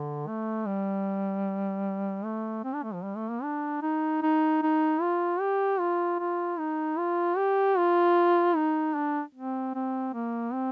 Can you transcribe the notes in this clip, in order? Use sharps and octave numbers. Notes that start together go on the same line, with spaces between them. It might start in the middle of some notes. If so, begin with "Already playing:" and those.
Already playing: D3
A3
G3
A3
C4
D4
A3
F3
G3
A3
A#3
D4
D#4
D#4
D#4
F4
G4
F4
F4
D#4
F4
G4
F4
D#4
D4
C4
C4
A#3
C4